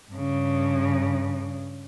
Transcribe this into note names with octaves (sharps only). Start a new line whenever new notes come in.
G2 C#3